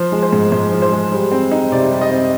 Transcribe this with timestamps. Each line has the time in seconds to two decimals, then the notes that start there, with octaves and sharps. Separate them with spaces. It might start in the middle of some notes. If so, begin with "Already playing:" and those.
Already playing: F3 C5
0.12 G#3
0.22 C5
0.33 G#2
0.52 G#2 C5
0.72 F3
0.82 C5
0.92 G#3
1.12 G3
1.32 C4
1.51 D#4
1.72 C3 D5
1.91 G3
2.02 D#5
2.11 C4